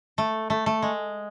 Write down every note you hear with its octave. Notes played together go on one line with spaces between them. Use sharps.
A3
A3
A3
G#3